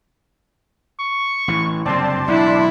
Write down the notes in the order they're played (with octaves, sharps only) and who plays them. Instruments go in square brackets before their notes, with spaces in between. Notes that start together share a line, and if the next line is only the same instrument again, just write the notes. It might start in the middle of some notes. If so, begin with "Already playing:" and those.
[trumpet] C#6
[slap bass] A1 E3
[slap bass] F#1 G2 C3 [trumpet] C4 [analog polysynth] D5 A5 C6
[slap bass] B1 E2 [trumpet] D4 [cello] E4